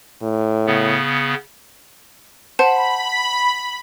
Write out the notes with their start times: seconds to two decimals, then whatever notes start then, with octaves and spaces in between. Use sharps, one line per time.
0.22 A2
0.66 C#3 B3
2.59 C5 F#5 A5 B5